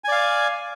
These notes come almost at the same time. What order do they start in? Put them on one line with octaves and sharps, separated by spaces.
G#5 D5 F5